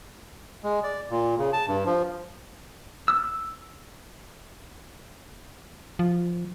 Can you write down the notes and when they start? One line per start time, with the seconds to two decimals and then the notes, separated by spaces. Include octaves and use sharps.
0.63 G#3
0.84 D5
1.10 A#2
1.38 C#3
1.53 A5
1.68 G2
1.86 F3
3.08 E6
5.99 F3